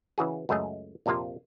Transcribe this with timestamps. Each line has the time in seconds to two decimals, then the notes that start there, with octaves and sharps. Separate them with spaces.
0.18 C#3 E3 F#4 G#4
0.49 C#2 F#2 A3 G#4 D#5
1.06 A#1 F2 C3 A#3 F4